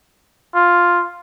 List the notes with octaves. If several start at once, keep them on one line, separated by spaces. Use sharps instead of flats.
F4